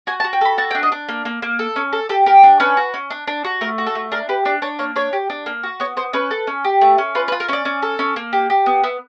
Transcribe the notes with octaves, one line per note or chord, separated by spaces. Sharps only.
F#4 G#5
A5
F#4
G5
A4 B5
F#4 A5
G5
D4
D#5
D4
A#3
A#3
A#3
A4
C#4
A4
G4 A4
G4 A#4
D4
C#4 B4
F#4
C#4
D4
D4
F#4
A3 A#4
F#4
A4
A3
D4 A#4
G4 B4
D4 D5
D4 C#5
A#3 C#5
D4 C#5
G4
D4
A#3
F#4
B3 C#5
B3 C5
C#4 B4
A4
C#4
G4
A3
C#4
F4 B4
B4
F4
A#4
C#4 C#5 D5
C#4
A4
C#4
A#3
G4
G4
B3
B3 E5